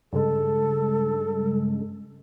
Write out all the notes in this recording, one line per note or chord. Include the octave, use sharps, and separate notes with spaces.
G2 C#3 G#3 A4